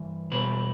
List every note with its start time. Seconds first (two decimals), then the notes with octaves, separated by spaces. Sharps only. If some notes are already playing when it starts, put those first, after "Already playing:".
Already playing: G2 E3
0.31 E2 B2 G3 B4